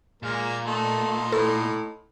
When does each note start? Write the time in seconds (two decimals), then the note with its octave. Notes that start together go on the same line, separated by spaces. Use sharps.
0.23 A#2 G#3 A#3 A#4
0.66 A3 D#4 C6
1.32 A2 A4